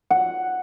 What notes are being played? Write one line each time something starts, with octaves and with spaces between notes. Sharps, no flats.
F#5